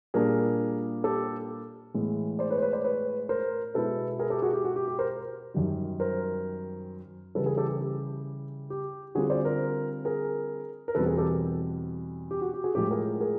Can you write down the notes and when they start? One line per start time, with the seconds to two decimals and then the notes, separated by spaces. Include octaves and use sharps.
0.14 A#2 G3 A#3 D4 G#4 A#4
1.04 G4 A4
1.94 A2 E3 G#3 B3
2.39 C5 D5
2.51 B4 C#5
2.57 C5
2.61 B4 C#5
2.73 C5 D5
2.84 B4 C#5
3.29 A#4 C5
3.74 B2 G#3 B3 E4 A4 B4
4.19 G#4 A#4
4.30 G4 A4
4.42 F#4 G#4
4.53 G4
4.64 F#4
4.76 G4
4.88 G4
4.99 A#4 C5
5.54 F#2 D#3 G3
6.00 A#4 C5
7.35 C#3 E3 G3 A4 B4
7.46 G#4 A#4
7.57 G4 A4
7.68 G4
7.80 G4
8.70 G4
9.15 D3 G3 C4 F4 F#4 G#4
9.30 C5 D5
9.45 A#4 C5
10.05 G#4 A#4
10.88 A#4
10.95 E2 B2 G3 C4 A4 B4
11.06 G#4 A#4
11.18 G4 A4
12.31 G4
12.41 F#4
12.53 G4
12.64 F#4 G#4
12.75 A2 F3 G#3 G4 A4
12.91 G#4 A#4
13.20 G#4 A#4